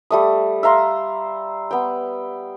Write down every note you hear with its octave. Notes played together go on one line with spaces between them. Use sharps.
G3 A3 D#6
E5 F5 A#5 C6
B3 G5